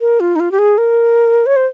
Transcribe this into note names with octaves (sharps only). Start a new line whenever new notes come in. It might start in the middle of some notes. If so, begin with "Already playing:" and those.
A#4
F4
D#4
F4
G4
G#4
A#4
C#5
C5